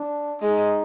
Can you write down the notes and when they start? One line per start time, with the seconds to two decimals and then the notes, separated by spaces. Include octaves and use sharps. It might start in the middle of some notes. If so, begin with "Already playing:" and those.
Already playing: D4
0.42 G#3 D#4